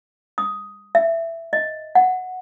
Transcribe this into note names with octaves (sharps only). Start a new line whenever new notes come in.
D#6
E5
D#5
F#5